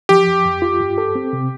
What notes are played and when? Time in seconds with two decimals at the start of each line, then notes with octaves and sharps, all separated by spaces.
0.09 F3 G4
0.27 F2
0.45 F2
0.62 F4
0.80 G2
0.98 A4
1.15 C4
1.33 C3